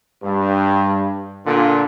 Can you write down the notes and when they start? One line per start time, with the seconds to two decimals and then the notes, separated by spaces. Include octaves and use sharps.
0.23 G2
1.46 A#2 D3